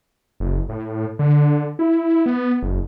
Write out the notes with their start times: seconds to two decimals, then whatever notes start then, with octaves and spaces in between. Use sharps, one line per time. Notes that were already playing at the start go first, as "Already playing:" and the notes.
0.40 F#1
0.69 A2
1.19 D3
1.79 E4
2.26 B3
2.62 F#1